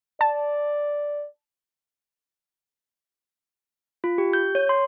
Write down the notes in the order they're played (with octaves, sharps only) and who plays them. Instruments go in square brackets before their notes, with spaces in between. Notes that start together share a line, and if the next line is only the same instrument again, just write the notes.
[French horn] D5 [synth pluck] A5
[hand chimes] F4
G4
G6
C#5
C6